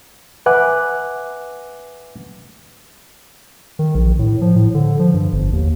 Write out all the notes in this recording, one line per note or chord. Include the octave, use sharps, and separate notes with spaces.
B4 E5 F#5 G#5 D6 F#6
D#3
A#1
A2
F3
A2
D3
F3
G2
G1
D#2